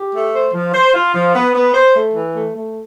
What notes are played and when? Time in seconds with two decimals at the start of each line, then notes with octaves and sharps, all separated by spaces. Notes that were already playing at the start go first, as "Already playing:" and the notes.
Already playing: G4
0.13 A3
0.34 C5
0.53 F3
0.73 C5
0.94 F4
1.14 F3
1.34 B3
1.54 B3
1.74 C5
1.94 A3
2.14 E3
2.34 A3
2.54 A3